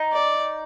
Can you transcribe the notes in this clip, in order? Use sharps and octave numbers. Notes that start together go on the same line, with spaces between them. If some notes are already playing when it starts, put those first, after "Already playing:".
Already playing: D#4
D5